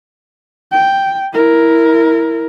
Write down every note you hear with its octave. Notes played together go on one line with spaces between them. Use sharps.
G5
E4 A#4